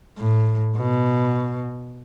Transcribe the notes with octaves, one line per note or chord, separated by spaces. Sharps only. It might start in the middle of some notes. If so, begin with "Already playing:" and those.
A2
B2